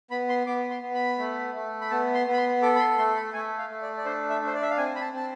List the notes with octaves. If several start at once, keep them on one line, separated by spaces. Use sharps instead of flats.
B3 B5
C6
B3 D6
C6
B3
B5
A3
A3
B5
B3 A5
C6
B3
B5
C6
A4 D6
B5
C6
A3 C6
B5
A3 G#5
F5
A3
D5
D5
D4 C5
E5
D4
C5
D5
E5
F5
C4 G#5
B5
A5
C4 A5